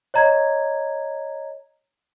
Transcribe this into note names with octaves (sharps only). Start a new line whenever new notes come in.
C#5 D#5 A#5 G#6